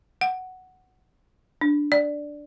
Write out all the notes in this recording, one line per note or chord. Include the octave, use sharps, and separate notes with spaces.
F#5
D4
D5